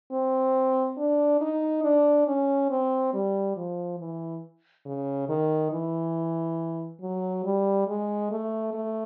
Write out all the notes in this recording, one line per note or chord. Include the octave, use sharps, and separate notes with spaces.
C4
D4
D#4
D4
C#4
C4
G3
F3
E3
C#3
D#3
E3
F#3
G3
G#3
A3
A3